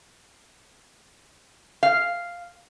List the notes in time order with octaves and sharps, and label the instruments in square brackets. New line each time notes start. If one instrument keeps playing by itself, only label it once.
[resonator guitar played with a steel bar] F5